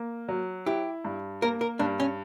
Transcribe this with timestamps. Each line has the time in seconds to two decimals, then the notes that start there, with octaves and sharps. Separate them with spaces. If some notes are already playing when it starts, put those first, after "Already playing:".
Already playing: A#3
0.28 F#3
0.66 E4 G4
1.05 G2
1.42 A#3 A#4
1.61 A#4
1.79 G2 D4
2.00 C#4